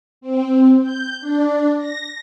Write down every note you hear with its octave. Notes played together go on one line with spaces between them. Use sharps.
C4
G6
D4
A#6